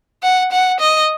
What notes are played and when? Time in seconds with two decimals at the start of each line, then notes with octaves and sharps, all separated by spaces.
0.23 F#5
0.52 F#5
0.80 D#5